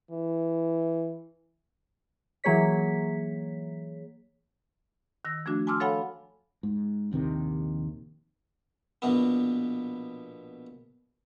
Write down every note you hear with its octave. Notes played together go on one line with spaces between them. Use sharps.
E3
E3 F#3 A#3 G#4 C#5 B6
D#3 E6 A#6
F3 A3 D4 F#4
G#5 A5 C6 D6 E6 F6
A4 C#5 F5 F#5 G#5 B5
G#2
A#1 D#2 C3 D#3
A#1 B2 B3